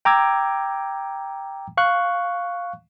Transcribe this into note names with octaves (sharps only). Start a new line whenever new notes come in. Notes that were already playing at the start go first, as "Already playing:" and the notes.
G5 A#5 D6 E6 G#6
F5 C#6 F#6